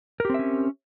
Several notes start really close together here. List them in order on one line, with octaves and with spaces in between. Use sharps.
A#4 G4 C4 E5 C#4